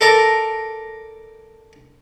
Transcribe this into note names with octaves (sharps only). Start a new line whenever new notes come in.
A4 A#4 D5 A#5